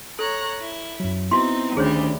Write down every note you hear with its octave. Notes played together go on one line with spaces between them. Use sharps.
A4 C#5 A#5 F#6
E4
F#2 F#3
B3 C4 D#4 E4 F#4 C6
D2 D#3 G3 C#4 D4 G#4 C5 C#5